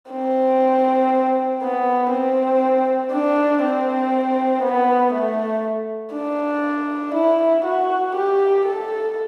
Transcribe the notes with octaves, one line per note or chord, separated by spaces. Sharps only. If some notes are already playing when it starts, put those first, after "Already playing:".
C4
B3
C4
D4
C4
B3
A3
D4
E4
F#4
G4
A4